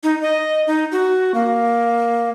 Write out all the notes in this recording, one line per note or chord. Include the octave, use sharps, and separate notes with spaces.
D#4
D#5
D#4
F#4
A#3